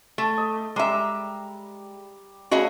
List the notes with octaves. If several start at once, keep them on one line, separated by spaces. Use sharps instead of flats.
A3
D#5
G3 G#3 E5 A#5 D6
C#3 A3 F#4 G#4 D#5 B5